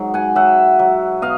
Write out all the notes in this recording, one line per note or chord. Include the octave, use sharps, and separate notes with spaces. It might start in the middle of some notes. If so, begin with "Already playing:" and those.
Already playing: G#2 F#3
F#5 G#5
F#3 E5 F#5
F#3
B2 D#5 F5